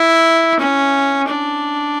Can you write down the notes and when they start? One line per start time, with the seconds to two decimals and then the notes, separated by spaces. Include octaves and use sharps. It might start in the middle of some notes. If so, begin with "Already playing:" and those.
Already playing: E4
0.60 C#4
1.29 D4